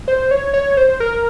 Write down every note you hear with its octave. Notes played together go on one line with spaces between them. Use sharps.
C5
C#5
C#5
C5
A#4